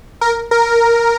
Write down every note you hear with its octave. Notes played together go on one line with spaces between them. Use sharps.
A#4
A#4